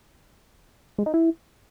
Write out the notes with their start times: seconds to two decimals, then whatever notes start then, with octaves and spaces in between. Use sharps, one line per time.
0.98 G#3
1.06 D#4
1.14 E4